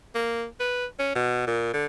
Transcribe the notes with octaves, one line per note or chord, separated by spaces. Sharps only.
A#3
B4
C#4
B2
A#2
D3